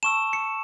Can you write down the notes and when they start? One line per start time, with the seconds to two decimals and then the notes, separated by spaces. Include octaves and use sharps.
0.03 A5 C#6 E6 E7
0.33 C#7